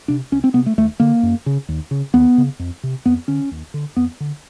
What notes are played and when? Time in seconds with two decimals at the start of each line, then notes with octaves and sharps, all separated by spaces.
0.08 C3 D4
0.32 C2 C#4
0.44 C4
0.54 C3 B3
0.66 A3
0.78 D#2 A3
1.00 D3 A#3
1.23 F#2
1.46 C#3
1.69 D#2
1.91 C#3
2.14 D#2 B3
2.38 C#3
2.59 F2
2.83 C3
3.06 F2 B3
3.28 D3 C#4
3.51 D#2
3.74 D3
3.96 F2 B3
4.20 D3